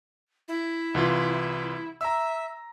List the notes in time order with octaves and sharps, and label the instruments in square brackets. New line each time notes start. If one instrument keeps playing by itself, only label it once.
[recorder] E4
[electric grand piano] C2 E3 F4
[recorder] E5 [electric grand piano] A#5 E6